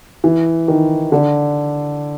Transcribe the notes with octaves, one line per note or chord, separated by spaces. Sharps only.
E3
D#3
D3